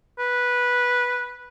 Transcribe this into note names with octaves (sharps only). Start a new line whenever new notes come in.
B4